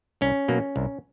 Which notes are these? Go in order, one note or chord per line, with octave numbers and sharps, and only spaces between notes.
C2 C#4
B2 F#3 A#3
C2